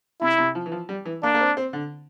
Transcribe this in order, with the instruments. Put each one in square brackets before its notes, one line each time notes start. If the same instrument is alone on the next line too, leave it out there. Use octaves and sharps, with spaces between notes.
[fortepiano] C3 [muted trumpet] E4
[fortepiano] C3
F3
E3
F3
G3
E3
[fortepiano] A#3 [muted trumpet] D4
[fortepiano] A#3
C4
C4
D3